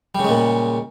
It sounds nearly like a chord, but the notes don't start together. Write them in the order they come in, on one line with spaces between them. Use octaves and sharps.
G3 C#3 G#3 A#2